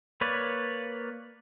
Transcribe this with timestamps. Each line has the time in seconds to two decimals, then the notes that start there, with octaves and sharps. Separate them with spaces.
0.21 A#3 B4 C#5 D5